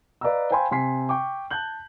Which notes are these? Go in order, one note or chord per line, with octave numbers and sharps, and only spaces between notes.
B4 D5 D#5 F5 A#5 E6
C5 F5 G5 G#5 B5 C6
C3 G#5 C6 B6 C7
G5 C#6 D6
A5 F#6 G6 F#7